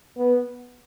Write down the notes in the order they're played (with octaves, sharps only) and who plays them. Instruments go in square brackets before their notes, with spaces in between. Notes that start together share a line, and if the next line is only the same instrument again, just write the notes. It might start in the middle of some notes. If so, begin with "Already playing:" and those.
[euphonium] B3